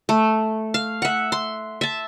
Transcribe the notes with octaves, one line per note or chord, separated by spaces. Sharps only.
A3
F5
E5 F#5
C6
E5 A5